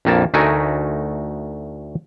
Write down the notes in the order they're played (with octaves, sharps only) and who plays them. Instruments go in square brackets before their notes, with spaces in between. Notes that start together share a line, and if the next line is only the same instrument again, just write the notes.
[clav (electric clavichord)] A#1 F2 A#3 A5
D2 A3 D#4 F#4 A#4 G#5